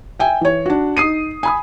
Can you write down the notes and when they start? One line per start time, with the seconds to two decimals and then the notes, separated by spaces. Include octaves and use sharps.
0.19 E5 G5 G#5
0.41 E3 C#5
0.66 D4 F#4
0.97 D#4 D#6 C7 D#7
1.43 G#5 B5 D#6